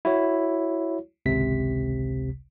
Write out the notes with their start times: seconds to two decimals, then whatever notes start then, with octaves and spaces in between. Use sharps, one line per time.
0.05 E4 F#4 C#5
1.26 G#1 C#2 C3 B6